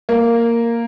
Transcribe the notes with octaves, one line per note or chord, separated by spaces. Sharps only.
A#3